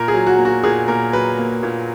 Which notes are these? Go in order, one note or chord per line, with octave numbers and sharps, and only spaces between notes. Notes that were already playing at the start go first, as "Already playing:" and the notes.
Already playing: A#2 A#4
G#4
F#3
F#4
A#3
F#4
A#2 G#4
A#2 A#4
F#3 B4
A#3
A#2